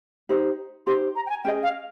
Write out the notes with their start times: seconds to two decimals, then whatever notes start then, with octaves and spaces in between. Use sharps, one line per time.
0.29 D#4 G4 C5
0.87 D#4 G4 C5 C6
1.16 A#5
1.26 G5
1.30 G#5
1.44 C#4 G#4 D#5 G5
1.63 F5